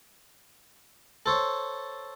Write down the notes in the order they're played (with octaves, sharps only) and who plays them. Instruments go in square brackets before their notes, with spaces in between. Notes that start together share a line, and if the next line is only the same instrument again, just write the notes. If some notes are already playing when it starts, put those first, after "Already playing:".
[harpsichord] A4 C5 C#5